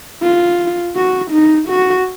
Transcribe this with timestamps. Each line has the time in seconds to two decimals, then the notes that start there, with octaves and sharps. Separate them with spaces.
0.23 F4
0.96 F#4
1.32 D#4
1.69 F#4